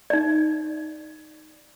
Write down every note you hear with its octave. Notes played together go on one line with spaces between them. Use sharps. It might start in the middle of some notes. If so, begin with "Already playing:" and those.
D#4 D5